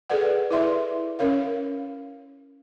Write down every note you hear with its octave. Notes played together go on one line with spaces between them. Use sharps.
G#4 A4 B4 D5 F#5
E4 B4 D5 E5 C6
C#4 A#4 C#5 F5